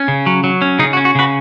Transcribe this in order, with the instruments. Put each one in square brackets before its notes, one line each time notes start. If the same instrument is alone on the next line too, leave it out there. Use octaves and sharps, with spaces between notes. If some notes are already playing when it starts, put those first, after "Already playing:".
Already playing: [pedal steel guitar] C#4
C#3
F#3
F#3
C#4
C#3 D#4 G#4
F#4
C#4
F#4
C#3 F#4 B4